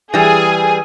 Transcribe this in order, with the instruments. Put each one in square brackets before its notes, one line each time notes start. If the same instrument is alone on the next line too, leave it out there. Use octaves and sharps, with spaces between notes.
[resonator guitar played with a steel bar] E3 G3 [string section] G#4 G#5